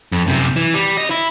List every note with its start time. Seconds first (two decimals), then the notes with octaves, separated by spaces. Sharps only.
0.12 F2
0.27 F#2 C3
0.56 E3
0.74 G3
0.98 C#4 D#5
1.11 E4